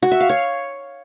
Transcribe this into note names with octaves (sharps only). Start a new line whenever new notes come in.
F#4
E5
F5
C#5